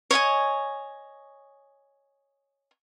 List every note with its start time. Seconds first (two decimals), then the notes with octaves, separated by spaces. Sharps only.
0.11 C#5 D#5 E5 G#5